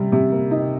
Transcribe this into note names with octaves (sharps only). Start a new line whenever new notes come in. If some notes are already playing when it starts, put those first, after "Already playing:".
Already playing: C3 G3
C3
A#3
D#4